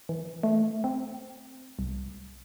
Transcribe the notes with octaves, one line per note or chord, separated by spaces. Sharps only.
E3
A3
C4
C2